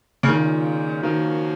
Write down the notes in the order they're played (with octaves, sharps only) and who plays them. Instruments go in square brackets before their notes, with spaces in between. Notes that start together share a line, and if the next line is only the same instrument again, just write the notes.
[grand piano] C#3
[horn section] A#2 G#3 C#4 F4 [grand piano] D#3
[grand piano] D#3 [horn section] F3 A#3 C#4 F#4